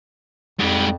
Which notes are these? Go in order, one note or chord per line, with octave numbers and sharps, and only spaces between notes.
F2 G#2 G3